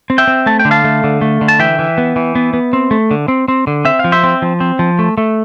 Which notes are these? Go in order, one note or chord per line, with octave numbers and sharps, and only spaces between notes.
C4
E5 G5
C4
A3 A5
G5
D3
F5 A5
A3
D3
A3
D3
A5
E3 E5 G5
E3
B3
E3
B3
B3
C4
A3
D3
C4
C4
D3
C4 E5
F5
F3
C5 E5
C4
F3
C4
F3
A3
A3